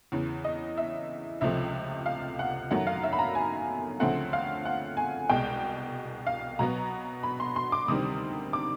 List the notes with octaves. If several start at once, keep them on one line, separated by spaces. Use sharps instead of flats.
E2 C#3 E3
D#5
E5
C#2 C3 F3 A3 E5
F5
F#5
F#2 D#3 F#3 A3 F#5
F5
E5
B5
A#5
G#5
D2 C#3 F3 A3 C4 F#5
F5
F#5
G#5
C2 B2 G#3 G5
F5
B2 F#3 B3 A#5
B5
C6
C6
D6
D2 C3 D#3 G3 C4 D#6
D6